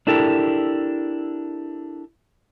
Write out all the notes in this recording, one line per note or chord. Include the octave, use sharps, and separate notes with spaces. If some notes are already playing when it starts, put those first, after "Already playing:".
D4 E4 G4 A4 A#4